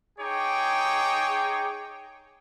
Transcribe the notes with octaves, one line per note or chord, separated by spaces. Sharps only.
D#4 G#4 C#5 G5 D6